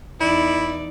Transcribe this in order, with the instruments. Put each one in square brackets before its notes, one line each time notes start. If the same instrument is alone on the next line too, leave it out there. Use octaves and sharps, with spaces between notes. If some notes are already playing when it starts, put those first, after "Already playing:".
[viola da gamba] E2 D#4 D5 [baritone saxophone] E4